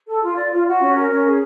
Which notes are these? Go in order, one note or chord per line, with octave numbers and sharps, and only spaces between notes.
A4
F4
D5
F4
F#4
C#4
A#4
C#4
G#4